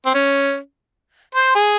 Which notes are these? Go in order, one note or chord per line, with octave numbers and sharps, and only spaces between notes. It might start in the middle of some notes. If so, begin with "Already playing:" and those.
C4
C#4
C5
G#4